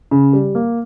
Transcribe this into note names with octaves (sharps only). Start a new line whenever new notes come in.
C#3
G3
A#3